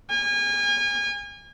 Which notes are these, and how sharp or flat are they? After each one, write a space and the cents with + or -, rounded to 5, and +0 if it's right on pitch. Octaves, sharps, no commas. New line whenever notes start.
G#5 -35